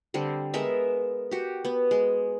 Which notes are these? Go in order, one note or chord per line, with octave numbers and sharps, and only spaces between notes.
D3 G3 C4
G#3 B3 A#4 E5
F#4 G4
B3
G#3